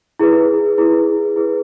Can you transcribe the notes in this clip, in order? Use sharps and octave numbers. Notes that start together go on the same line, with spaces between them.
E4 G#4 B4
E4 G#4 B4
E4 G#4 B4